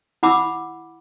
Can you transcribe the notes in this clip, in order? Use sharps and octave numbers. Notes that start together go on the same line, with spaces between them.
E4 F#5 B5 D6 E6